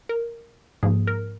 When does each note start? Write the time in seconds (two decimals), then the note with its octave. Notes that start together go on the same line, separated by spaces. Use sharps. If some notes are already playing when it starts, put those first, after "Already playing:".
0.09 A#4
0.83 G#2 F3 A#3 G#4
1.07 A#4